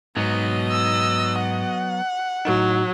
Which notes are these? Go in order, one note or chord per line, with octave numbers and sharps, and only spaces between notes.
G#2 F#3 B3 D#5
E6
F#5
A2 F#3 D#4